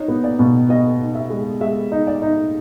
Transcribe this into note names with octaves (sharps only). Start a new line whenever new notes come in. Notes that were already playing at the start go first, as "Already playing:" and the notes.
Already playing: D#4 C#5
B3
D5
B2
B3 D#5
D#4
E5
G#3
G#3 E5
D#4
D5
D#4